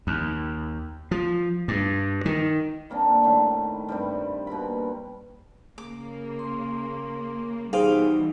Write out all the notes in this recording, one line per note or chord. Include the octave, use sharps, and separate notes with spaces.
D#2
F3
G2
D#3
G3 A#3 C4 D4
A2 D#3 G3 A3
G2 C3 G3
B2 A#3 C4 B5
C#3 A#3 D6
C6
B2 E3 G3 D#4 G4 G#4 C5 F5